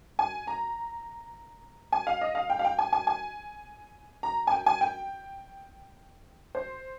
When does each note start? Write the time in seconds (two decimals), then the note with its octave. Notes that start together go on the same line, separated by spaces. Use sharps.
0.19 G#5
0.47 A#5
1.92 G#5
2.07 F5
2.21 D#5
2.35 F5
2.50 G5
2.59 F5
2.65 G5
2.79 G#5
2.93 G#5
3.07 G#5
4.23 A#5
4.47 G#5
4.52 G5
4.66 G#5
4.81 G5
6.55 C5